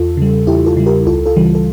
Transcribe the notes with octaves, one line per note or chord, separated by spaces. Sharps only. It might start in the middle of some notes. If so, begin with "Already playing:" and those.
Already playing: E2 F4 A4
C#3 G3
E2 E4 G4
F4 A4
C#3 G3
G4 A#4
C#2 F4 A4
F4 A4
C#3 E3 G3
A4